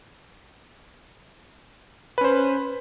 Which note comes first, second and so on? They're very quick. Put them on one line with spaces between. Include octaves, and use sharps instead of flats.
B4 C#4 C5